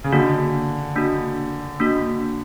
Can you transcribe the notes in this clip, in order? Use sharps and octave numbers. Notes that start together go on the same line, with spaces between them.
C#3
D3 A#3 D4 F#4
A#3 D4 F#4
A#3 D4 F#4